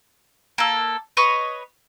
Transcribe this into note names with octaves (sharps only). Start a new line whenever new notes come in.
A#3 A4
B4 C#5 D#5 C#6